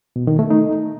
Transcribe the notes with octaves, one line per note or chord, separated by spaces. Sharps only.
B2
D#3
A3
D#4